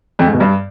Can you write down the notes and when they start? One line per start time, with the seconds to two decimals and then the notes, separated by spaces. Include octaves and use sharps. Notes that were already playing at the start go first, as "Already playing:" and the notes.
0.19 F2
0.26 G#2
0.33 B2
0.40 G2